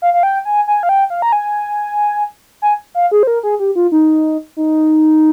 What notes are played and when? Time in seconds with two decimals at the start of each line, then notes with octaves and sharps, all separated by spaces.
0.02 F5
0.14 F5
0.23 G5
0.45 G#5
0.67 G#5
0.83 F5
0.89 G5
1.10 F5
1.22 A#5
1.32 G#5
2.62 G#5
2.95 F5
3.11 G#4
3.23 C5
3.27 A#4
3.43 G#4
3.60 G4
3.76 F4
3.92 D#4
4.57 D#4